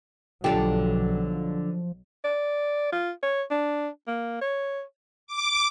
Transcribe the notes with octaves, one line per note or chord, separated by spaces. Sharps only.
B1 D3 F3 F#3 D4 G4 A4
D5
F4
C#5
D4
A#3
C#5
D6